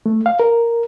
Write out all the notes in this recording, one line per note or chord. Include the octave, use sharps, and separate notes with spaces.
A3
F5
A#4